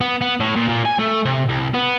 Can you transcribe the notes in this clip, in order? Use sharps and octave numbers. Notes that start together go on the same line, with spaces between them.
B3
B3
A2
A#2
A#2
G#5
A3
C3
C2
B3